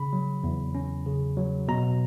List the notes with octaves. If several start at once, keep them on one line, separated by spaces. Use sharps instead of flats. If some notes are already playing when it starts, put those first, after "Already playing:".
Already playing: C#3 B5
F#3
E2
C#4
C#3
F#3
B2 A#5